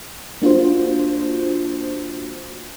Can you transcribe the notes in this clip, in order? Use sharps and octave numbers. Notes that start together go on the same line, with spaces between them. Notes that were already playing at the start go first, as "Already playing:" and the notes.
A#3 D4 F4 F#4 C5